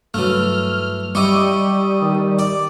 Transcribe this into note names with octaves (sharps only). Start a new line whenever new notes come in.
G2 E3 F#3 A3 F6
G3 E4 G4 D#5 C#6 D#6
D#3
D5